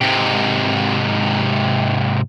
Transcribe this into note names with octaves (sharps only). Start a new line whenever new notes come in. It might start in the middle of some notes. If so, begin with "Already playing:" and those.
G#2 C3